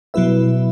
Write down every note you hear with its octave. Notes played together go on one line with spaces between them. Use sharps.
B2 F#3 E4 B4 E5